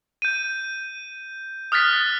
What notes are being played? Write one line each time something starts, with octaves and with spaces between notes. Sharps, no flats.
G6 D#7
D#6 F6 F#6 A6 B6